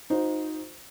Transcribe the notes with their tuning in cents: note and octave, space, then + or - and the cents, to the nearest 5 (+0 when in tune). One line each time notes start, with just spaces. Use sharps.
D#4 +0 F#4 -45 C5 +0